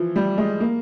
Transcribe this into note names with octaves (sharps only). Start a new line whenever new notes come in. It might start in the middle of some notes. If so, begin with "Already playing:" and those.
Already playing: E3 F3
G3
G#3
A#3